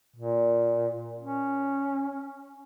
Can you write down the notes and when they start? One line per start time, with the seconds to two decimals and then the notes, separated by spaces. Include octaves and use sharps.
0.16 A#2
1.20 C#4